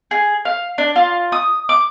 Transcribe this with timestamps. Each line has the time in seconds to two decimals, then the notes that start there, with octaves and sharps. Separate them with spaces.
0.11 G#4
0.45 F5
0.78 D4
0.96 F4
1.32 D#6
1.69 D6